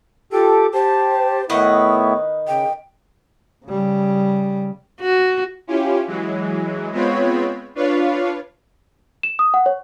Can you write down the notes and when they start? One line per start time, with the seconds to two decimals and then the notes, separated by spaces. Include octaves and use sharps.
0.32 F4 G4 A4 D6
0.74 G4 C5 A5
1.50 A2 D#3 B3 E4 B4 D#5 C#6
2.48 C#3 G5
3.65 C#3 G3
5.00 F#4
5.67 C#4 E4 F4 G4
6.07 E3 F#3 G#3
6.92 G#3 B3 C4 F4 C#5 B5
7.75 D4 F4 B4 C#5 F5
9.23 E7
9.39 D#6
9.54 F#5
9.66 C#5